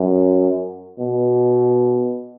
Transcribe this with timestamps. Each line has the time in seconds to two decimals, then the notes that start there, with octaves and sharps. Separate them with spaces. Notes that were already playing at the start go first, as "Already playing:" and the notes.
Already playing: F#2
0.99 B2